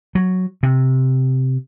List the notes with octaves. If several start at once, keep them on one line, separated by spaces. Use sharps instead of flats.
F#3
C3